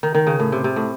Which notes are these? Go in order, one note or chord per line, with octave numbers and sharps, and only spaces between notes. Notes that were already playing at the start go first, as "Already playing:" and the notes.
D#3
D#3
C#3
A2
C3
C3
A2